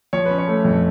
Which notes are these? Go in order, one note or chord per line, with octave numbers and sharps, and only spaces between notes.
F3 C#5
B4
C#4
C#5
A3
F2